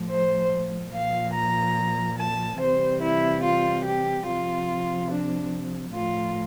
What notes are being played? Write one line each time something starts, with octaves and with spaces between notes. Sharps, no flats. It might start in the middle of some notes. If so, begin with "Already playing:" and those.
Already playing: A2 F3
C5
A#2 F3 F5
A#5
A5
C3 E3 G3 C5
E4
F4
G4
C3 F3 F4
D4
A2 F3 F4